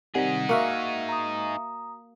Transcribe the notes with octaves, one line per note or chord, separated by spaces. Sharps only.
C3 D#3 G3 D#4 G#4 F#5 B6
A#3 F#4 E5 F5 C#6
A#5 D#6